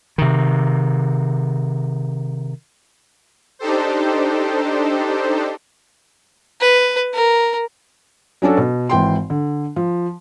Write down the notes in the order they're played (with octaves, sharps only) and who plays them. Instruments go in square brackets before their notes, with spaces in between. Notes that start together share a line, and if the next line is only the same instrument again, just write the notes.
[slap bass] C3 D#3
[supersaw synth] D4 D#4 G4 A4 C5
[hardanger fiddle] B4
A#4
[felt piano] F#3 C#4 D4 F#4 A4
B2
G#1 E3 G5 C6
D3
F3